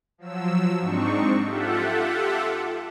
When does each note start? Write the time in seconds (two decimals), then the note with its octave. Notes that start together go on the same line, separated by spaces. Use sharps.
0.18 F3 F#3 E6
0.80 G#2 C4 D4 D#4 C#6
1.44 F4 G4 A4 E5 F#5